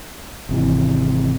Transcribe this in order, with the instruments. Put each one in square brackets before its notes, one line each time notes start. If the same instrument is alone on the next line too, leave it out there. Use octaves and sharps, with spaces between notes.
[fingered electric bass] G#1 C3 E3